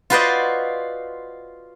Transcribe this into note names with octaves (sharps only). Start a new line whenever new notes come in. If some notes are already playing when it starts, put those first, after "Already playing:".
F4 F#4 B4 C5 D5 D#5